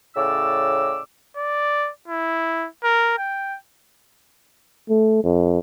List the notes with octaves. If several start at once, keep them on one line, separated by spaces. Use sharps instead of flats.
A2 C#3 D5 E6
D5
E4
A#4
G5
A3
F2